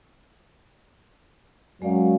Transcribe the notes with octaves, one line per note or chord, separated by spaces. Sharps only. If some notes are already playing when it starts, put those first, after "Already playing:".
F#2 F#3 G#3 D5 F5